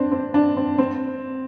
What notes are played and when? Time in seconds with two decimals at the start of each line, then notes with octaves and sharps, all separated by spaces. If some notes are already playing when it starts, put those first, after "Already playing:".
Already playing: C4 D4
0.12 C4
0.34 D4
0.57 C4
0.78 C4